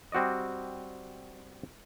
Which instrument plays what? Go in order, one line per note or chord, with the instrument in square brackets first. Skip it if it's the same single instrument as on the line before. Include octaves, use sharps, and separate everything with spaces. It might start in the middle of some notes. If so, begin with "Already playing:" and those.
[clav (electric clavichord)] G3 C4 F#4 D5 D#5